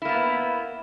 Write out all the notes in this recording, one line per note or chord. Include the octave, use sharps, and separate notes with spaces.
A#3 B3 E4